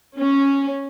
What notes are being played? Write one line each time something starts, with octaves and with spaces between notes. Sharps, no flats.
C#4